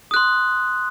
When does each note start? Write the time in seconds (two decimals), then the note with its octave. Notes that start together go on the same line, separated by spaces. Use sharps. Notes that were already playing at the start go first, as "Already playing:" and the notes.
0.11 D#6
0.14 F#6
0.16 C6